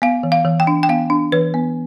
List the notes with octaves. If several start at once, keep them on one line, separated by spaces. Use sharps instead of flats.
B3 F5
E3
F5
E3
G5
D4
G5
B3 F5
D4
E3 B4
B3